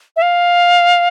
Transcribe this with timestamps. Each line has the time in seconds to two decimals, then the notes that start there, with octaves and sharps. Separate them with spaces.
0.16 E5
0.22 F5